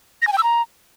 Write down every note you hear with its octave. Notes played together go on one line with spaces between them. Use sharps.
A#6
G#5
G5
E6
A#5